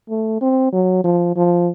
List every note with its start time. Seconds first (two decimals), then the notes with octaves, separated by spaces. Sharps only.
0.10 A3
0.41 C4
0.73 F#3
1.04 F3
1.36 F3